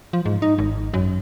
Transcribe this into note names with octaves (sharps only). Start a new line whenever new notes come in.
F3
G#2
D#4
G#1
F#2